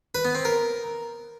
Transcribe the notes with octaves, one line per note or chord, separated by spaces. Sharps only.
B4
B3
C4
A#4